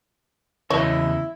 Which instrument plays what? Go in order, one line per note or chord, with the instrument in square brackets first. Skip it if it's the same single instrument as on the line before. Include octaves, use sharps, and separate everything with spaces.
[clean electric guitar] E2 C#3 D#5 [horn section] E4 [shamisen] C#5